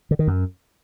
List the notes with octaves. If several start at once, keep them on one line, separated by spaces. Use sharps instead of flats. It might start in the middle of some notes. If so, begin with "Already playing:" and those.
D3
D#3
F#2